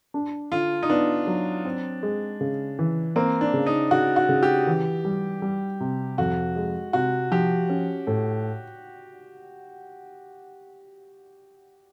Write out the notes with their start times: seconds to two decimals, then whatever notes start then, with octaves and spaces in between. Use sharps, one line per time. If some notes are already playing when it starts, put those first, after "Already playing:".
0.14 D4
0.52 D3 F4
0.83 D#4
0.90 B3 D4
1.27 F#3
1.65 C4
2.03 G#3
2.41 C#3
2.79 E3
3.16 A#3 C4
3.41 D4
3.54 C#3
3.66 D#4
3.91 C#3 F#4
4.16 F#4
4.29 C#3
4.43 G4
4.67 E3
5.05 G3
5.42 G3
5.80 C3
6.18 F2 F#4
6.56 G#3
6.93 C3 F#4
7.31 F3 G4
7.69 C#4
8.07 A2